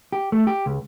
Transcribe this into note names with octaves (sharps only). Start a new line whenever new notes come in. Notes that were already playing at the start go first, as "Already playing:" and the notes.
G4
A3
G4
C#2